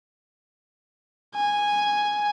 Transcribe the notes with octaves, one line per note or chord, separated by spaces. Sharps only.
G#5